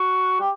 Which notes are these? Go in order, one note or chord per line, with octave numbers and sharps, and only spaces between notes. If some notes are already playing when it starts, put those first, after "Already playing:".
Already playing: F#4
G4